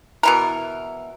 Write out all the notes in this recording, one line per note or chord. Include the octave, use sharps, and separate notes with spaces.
B2 E3 A#4